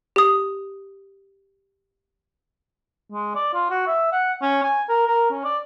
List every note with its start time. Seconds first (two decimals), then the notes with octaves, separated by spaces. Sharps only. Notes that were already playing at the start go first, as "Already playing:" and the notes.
0.16 G4 D#6
3.12 G#3
3.35 D5
3.54 F4
3.70 F#4
3.87 E5
4.12 F#5
4.42 C#4
4.63 G#5
4.89 A#4
5.07 A#4
5.31 C#4
5.44 D5